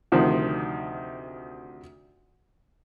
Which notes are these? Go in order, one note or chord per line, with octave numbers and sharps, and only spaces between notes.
D2 C3 D#3 F3